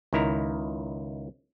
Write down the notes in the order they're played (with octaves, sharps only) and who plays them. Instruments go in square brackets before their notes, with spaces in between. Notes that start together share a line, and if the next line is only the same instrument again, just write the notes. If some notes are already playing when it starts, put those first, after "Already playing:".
[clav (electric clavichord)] C#2 D#3 E4 A#5